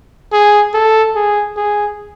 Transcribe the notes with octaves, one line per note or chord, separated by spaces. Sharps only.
G#4
A4
G#4
G#4